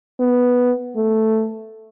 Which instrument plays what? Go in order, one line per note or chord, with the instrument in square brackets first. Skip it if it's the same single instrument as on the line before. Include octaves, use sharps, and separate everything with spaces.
[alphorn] B3
A3